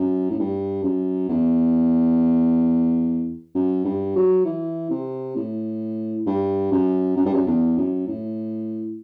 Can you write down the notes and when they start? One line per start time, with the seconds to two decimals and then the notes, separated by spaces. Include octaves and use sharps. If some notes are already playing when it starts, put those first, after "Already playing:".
Already playing: F#2
0.30 A2
0.39 G2
0.83 F#2
1.29 E2
3.55 F#2
3.85 G2
4.15 F#3
4.45 E3
4.90 C3
5.36 A2
6.26 G2
6.72 F#2
7.16 F#2
7.26 G2
7.34 F#2
7.47 E2
7.77 F#2
8.07 A2